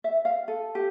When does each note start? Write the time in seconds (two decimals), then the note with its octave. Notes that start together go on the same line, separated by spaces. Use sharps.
0.04 E5
0.25 F5
0.48 A4
0.75 G4